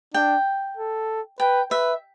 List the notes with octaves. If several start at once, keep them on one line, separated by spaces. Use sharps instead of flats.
D4 G5
A4
B4 G5
B4 E5